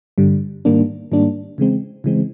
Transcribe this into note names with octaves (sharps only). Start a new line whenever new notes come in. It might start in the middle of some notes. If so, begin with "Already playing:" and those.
G2 D3 G3
G#2 D#3 G3 A#3 D4
G#2 D#3 G3 A#3 D4
C#3 E3 G#3 C4
C#3 E3 G#3 C4